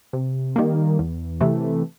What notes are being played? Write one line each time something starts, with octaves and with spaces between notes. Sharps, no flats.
C3
D#3 G3 A#3
E2
C3 E3 A3